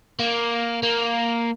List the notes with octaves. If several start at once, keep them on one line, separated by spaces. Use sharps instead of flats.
A#3
A#3